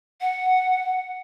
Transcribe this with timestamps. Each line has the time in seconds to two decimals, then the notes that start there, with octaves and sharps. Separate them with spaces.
0.21 F#5